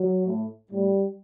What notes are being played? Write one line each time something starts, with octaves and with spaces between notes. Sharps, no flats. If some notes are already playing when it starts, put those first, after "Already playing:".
Already playing: F#3
A2
A2 G3